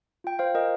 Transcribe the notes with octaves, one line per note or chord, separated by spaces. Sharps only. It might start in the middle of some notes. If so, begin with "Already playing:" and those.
F4 G5
F4 C5 F5
F4 A#4 D#5